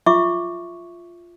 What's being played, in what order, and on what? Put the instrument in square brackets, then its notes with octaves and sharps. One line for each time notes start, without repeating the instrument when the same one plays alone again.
[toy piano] F4 E5 C#6 D6